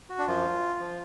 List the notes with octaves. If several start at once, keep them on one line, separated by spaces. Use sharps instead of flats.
F#4
D4
F#2 F3 F4
F3